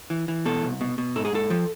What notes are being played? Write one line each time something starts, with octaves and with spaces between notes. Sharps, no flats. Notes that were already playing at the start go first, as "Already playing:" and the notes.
E3
E3
B2 A4
C2
B2
B2
G#2 A4
G#4
G#2 A4
F3